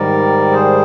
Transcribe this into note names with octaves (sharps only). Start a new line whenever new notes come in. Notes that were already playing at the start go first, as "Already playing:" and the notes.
Already playing: G#2 D#3 G3 A#4 D5
G#4 C5